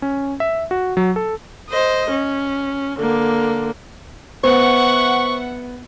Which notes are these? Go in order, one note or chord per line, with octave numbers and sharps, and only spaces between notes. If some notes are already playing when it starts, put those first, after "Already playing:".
C#4
E5
F#4
F#3
A4
C5 D#5
C#4
D3 A#3
B3 C5 E5 F#5 C#6